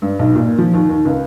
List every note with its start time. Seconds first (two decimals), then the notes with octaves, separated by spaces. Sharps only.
0.02 G2
0.19 B1
0.36 A#2
0.58 F3
0.74 D#2
0.89 D#2
1.05 C#2